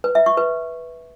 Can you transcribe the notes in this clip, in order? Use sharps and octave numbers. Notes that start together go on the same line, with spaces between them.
B4
E5
C#6
B4